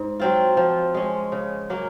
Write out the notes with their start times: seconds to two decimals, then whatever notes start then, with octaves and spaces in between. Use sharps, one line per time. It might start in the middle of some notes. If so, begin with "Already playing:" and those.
Already playing: G#2
0.20 F#3 C4 F4
0.57 F3
0.94 G#3 C#4
1.32 C#3
1.70 F#3 A#3 C#4